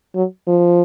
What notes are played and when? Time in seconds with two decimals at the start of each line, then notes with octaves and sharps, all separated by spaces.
0.15 F#3
0.47 F3